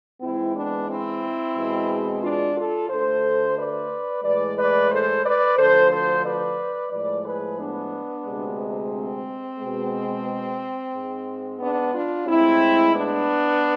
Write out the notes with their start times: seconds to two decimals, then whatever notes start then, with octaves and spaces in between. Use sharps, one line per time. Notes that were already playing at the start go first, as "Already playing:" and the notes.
0.21 G#2 E3 G#3 C4 E4
0.55 B3 D4
0.88 C4 E4
1.55 E2 B2 G#3
2.22 D4 F4
2.55 F4 A4
2.89 D2 D3 A3 A4 C5
3.56 B4 D5
4.23 A2 E3 G#3 B4 D5
4.56 B4 D5
4.90 A4 C5
5.24 B4 D5
5.57 D2 D3 F3 A4 C5
5.90 A4 C5
6.24 B4 D5
6.91 A2 F3 G#3 B4 D5
7.24 G#4 B4
7.58 B3 D4
8.25 D2 C3 G#3
8.93 C4
9.59 B2 G#3
10.93 G#2 G#3
11.60 B3 D4
11.93 D4 F4
12.27 A2 G#3 C4 E4
12.94 B3 D4